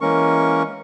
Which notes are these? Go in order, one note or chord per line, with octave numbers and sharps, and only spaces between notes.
E3 G#3 A#3 C#4 A#4 C#6